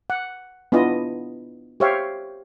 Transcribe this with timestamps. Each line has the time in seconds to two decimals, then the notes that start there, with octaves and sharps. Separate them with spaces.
0.10 F#5
0.72 B3 D4 E4 F4 D#5
1.80 G4 C5 C#5 E5 F5 G5